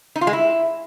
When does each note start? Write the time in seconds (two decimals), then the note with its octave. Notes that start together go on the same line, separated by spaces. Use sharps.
0.16 D#4
0.21 F4
0.27 G#3
0.33 E4